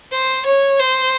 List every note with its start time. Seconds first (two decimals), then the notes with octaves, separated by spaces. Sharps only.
0.11 C5
0.45 C#5
0.80 C5